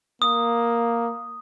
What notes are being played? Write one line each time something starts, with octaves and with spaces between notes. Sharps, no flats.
A#3 D#6